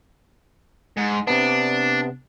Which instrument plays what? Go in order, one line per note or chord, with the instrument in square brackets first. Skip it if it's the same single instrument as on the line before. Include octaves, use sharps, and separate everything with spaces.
[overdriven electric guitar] G#2
[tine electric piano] C3 B3 [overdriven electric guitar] D4